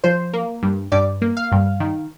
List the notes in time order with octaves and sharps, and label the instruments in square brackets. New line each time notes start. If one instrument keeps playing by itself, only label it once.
[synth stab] F3 C5
A#3
G2
G2 D5
A#3
F5
G2
D#3